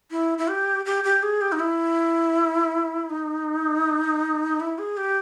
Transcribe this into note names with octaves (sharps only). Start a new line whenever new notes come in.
E4
E4
G4
G4
G4
G#4
G4
D#4
E4
D#4
E4
G#4
G4